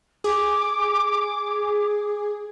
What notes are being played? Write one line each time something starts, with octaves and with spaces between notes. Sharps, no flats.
G#4 D6